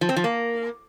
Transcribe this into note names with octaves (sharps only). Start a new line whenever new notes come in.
F3
C4
F3
A#3